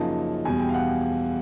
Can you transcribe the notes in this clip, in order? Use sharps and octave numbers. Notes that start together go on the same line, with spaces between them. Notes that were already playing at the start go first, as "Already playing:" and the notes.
Already playing: F#2 C#3 F3 A#3 D#4 A5
E2 B2 G3 G#5
G5
F5
F#5